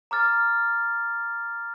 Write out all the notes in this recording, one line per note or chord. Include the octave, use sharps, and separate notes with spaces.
A#5 D6 F6 A6